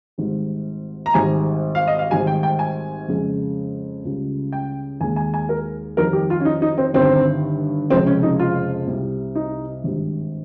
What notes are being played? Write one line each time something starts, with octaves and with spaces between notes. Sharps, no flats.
G#1 G#2 G3
A#5
G#1 G#2 G3 G#5
F5
D#5
F5
G#1 G#2 G3 G#5
G5
G5
G#5
F2 C#3 G#3
C#2 C#3 G3
G5
D#2 D#3 G#3 G#5
G#5
G#5
A#4
F2 D#3 G3 A#4
G4
F4
C#4
D#4
D#4
C4
G1 G2 D#3 C4
F1 F2 C#3 G#3 C4
C#4
D#4
F4
C2 C3 G3
D#4
G#1 G2 G3